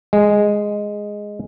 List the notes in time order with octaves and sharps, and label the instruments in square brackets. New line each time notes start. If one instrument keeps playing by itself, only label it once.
[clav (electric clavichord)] G#3